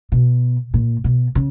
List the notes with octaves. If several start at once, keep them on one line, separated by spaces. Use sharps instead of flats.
B2
A#2
B2
C#3